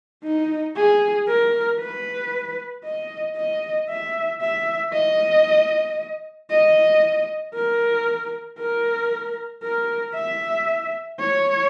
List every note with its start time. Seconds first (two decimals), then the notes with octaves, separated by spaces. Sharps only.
0.24 D#4
0.76 G#4
1.28 A#4
1.81 B4
2.85 D#5
3.37 D#5
3.89 E5
4.41 E5
4.93 D#5
6.50 D#5
7.54 A#4
8.59 A#4
9.63 A#4
10.15 E5
11.20 C#5